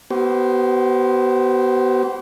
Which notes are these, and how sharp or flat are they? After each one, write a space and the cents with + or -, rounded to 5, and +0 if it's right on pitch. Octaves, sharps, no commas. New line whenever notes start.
B3 +0 G4 -45 C5 +0